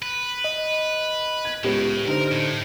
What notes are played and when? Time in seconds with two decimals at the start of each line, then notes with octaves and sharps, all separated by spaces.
0.02 B4
0.44 D#5
1.45 G#6
1.64 C#2 A2 B3 G4 C#5
2.08 D3 D#4 A#4 C5
2.32 A2